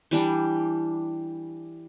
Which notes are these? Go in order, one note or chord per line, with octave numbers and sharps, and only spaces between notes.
E3 G3 D4